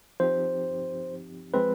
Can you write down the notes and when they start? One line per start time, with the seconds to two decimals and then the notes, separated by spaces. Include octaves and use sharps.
0.20 F3 C4 D#4 G4 C5
1.54 F3 G#3 C4 B4